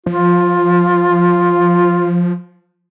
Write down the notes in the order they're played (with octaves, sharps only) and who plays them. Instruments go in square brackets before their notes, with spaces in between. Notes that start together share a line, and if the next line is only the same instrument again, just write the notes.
[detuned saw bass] F3 [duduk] F4